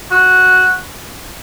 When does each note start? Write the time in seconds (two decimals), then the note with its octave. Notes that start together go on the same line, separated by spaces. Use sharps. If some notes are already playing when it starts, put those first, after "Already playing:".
0.11 F#4